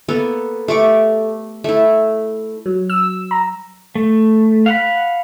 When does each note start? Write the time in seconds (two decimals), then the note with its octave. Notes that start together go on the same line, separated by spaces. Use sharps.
0.08 A#3 B3 A4
0.68 A3 G4 C#6 D6
1.64 A3 E4
2.66 F#3
2.90 E6
3.31 A#5
3.95 A3
4.66 F5 F#5 B5